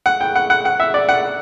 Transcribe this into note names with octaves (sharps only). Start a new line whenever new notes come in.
F#5
G5
F#5
F#5
F#5
E5
D5
F#5